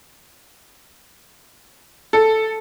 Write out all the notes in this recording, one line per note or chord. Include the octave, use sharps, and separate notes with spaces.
A4